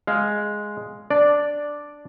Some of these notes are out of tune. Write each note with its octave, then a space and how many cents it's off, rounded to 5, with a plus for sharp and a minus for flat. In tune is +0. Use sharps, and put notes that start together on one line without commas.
G#3 +0 F5 +0
D4 +0 D5 +0